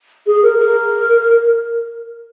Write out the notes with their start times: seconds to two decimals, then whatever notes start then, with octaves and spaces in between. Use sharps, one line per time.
0.27 G#4
0.43 A#4
0.59 A#4